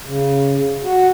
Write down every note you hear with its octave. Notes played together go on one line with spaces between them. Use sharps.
C#3
F#4